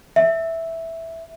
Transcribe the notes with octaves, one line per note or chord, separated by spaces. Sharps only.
E5